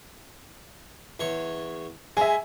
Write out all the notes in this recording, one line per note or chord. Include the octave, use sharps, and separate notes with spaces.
E2 C#5
G#3 E5 G#5